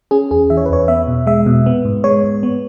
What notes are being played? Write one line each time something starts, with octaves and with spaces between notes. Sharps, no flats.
C#4 G#4
E2 G#4
E3 E5
C#5
B4
E2 C#5
B3 E5
B2
G#3 E5
B2
B3
G#2
G#3 C#5
G#2
B3